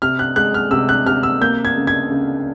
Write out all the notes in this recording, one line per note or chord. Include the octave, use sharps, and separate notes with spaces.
C3 F6
F#6
G#3 F#6
F6
C3 E6
F#6
C3 F6
E6
A#3 G6
G#6
C#3
G#6
C#3